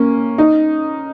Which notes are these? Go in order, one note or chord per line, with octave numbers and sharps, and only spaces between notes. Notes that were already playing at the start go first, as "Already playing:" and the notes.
Already playing: A#3 C#4
D#4